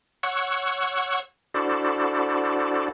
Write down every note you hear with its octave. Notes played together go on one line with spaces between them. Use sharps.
C#5 F#5 C#6 E6 F#6
D4 E4 F#4 A4 C5 D5